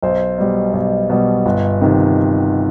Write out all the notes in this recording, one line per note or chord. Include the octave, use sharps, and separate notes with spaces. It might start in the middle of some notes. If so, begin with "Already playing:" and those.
B1 C5
B2 G3
B1
B2 G3
G1
C3 D#3